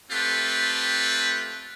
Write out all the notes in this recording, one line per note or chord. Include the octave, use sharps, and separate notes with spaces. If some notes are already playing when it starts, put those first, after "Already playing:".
A3 C4 F4 G4 B4